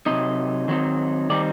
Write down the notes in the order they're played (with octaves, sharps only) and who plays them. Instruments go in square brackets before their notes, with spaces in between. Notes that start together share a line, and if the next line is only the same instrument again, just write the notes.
[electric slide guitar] C3 F#3 C4 D#4 D#5
D#3 F#3 C4 D#4
D#3 G3 C4 D#4 D5